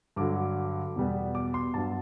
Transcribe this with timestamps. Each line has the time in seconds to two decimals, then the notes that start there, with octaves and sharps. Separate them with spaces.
0.16 G2 D3 F#3 D6
0.96 E2 B2 G3 B3
1.35 D6
1.54 C6
1.74 G2 F#3 B3 A5